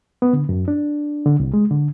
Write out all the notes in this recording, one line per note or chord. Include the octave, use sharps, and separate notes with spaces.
B3
D3
F#2
D4
D3
C2
G#3
D3